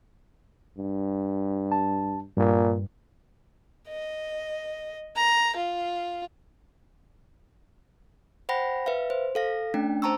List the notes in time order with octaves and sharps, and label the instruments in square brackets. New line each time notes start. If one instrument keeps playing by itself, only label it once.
[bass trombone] G2
[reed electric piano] A5
[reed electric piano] G2 [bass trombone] A#2
[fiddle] D#5
A#5
F4
[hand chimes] C5 F#5 G5 B5 A#6
B4 E5 F5
C5
A4 F5 A#6
A3 C#4 D4 G5
C5 A5 A#5 C#6 E6